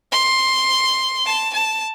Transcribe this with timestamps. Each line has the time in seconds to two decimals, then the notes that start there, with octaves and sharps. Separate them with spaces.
0.12 C6
1.26 A5
1.54 A5